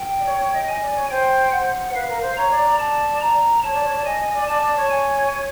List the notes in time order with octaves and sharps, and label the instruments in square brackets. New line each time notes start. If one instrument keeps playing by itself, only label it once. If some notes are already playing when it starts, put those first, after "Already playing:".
Already playing: [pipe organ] G5
[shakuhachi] D5
C#5
C#5
D#5
[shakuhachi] D#5 [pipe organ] G#5
[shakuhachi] D5
C#5
[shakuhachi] C5 [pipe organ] G5
[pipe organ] F#5
[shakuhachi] C5
[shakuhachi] B4 [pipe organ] F5
[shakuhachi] A#4
C5
[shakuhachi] C#5 [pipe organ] A#5
[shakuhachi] D5
D5
[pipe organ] A5
A#5
[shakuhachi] C#5 [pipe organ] A5
[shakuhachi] D5
C#5
D5
[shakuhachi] D#5 [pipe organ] G#5
[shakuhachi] D#5
D5
[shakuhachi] D5 [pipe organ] A5
[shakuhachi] D5
C#5
[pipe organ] G#5